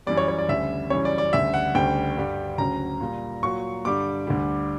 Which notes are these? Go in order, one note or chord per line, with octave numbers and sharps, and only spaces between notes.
F#2 E3 G3 D5
C#5
C#5
D5
D2 C#3 G3 E5
F#2 C#3 E3 G3 C#5
D5
D5
D2 C#3 G3 E5
F#5
D2 C#3 G3 G5
G2 D3 G3
D2 C#3 F#3 A#5
A#2 G3
A#2 F#3 C#6
G2 D3 G3 D6
D2 D3 G3